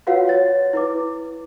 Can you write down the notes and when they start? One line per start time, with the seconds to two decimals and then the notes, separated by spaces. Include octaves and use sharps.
0.07 F4 F#4 B4 C#5 F5 F#5
0.28 C#5 A6
0.73 E4 B4 D6